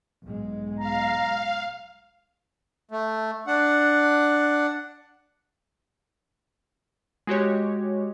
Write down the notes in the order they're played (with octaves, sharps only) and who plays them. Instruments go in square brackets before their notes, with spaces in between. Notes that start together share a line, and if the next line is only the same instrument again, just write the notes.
[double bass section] B1 G#2 G#3
[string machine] F5 [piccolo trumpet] A#5
[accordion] A3
D4 F#5
[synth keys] G#3 F#4 G4 C#5